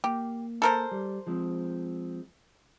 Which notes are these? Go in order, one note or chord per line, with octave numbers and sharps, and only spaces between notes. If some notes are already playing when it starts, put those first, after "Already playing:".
A#3 G4
A4 A#4 C5
G3
F3 G#3 C4